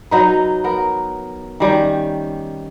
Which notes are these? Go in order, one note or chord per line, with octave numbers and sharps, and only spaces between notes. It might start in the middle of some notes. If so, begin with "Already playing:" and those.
F#3 D#4 B4
B3 A#4
D#3 G3 C#4